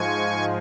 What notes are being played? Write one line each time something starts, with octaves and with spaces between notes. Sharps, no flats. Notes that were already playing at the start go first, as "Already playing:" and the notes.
Already playing: G#2 F3 G#3 G#5 C#6